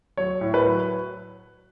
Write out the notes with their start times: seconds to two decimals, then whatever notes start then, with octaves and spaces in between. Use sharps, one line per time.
0.17 F#3 C#5
0.41 A2
0.54 B4
0.66 F#3